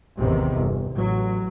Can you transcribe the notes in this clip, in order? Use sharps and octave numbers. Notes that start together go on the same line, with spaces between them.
A1 E2 C3 D#3
G1
A1 F#3